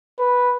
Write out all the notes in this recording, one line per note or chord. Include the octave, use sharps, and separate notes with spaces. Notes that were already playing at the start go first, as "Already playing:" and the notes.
B4